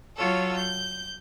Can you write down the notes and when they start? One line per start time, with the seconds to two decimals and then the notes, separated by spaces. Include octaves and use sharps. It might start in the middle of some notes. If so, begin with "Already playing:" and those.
0.17 F#3 F4 A4 C#5
0.57 G6